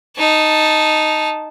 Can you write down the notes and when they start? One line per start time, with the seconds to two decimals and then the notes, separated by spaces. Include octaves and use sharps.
0.17 D#4 A5